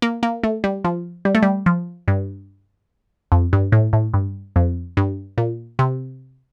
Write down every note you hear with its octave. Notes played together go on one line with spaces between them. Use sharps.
A#3
A#3
A3
G3
F3
G3
A3
G3
F3
G2
F2
G2
A2
A2
G2
F2
G2
A#2
C3